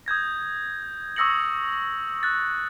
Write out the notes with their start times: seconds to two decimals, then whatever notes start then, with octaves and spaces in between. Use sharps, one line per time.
0.06 D#6 G6 G#6 A#6
1.16 C#6 D#6 E6 A#6 C#7 F#7
2.23 F#6 A6